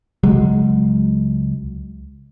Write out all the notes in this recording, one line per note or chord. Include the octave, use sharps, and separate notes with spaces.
C#2 F#3 G#3